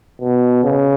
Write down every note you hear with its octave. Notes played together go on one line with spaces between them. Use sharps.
B2
C#3